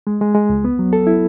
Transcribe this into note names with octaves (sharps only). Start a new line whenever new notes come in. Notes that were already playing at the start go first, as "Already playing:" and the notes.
G#3
G#3
G#3
C#2
B3
F#3
A4
E4